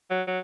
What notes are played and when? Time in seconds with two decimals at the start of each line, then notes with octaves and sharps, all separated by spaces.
0.10 F#3
0.27 F#3